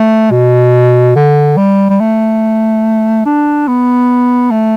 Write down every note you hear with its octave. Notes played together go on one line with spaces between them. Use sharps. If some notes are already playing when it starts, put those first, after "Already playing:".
Already playing: A3
B2
D3
G3
G3
A3
D4
B3
A3